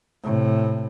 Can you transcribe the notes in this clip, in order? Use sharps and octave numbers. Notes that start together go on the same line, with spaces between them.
A2 C3